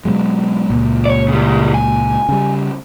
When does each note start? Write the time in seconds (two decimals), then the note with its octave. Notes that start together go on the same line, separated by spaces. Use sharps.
0.05 B2 F#3 G#3
0.70 C#2 A#2
1.06 C#5 D5
1.29 C#3 G3
1.74 G#5
2.29 C#3 G3